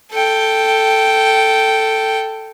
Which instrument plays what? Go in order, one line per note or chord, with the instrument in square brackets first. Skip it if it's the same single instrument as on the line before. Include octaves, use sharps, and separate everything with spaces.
[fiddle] A4 G5